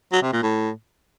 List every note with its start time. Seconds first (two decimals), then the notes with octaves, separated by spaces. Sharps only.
0.12 F#3
0.22 C3
0.32 A#2
0.43 A2